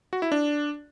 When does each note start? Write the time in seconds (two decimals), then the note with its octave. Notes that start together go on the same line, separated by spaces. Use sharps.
0.13 F#4
0.22 E4
0.32 D4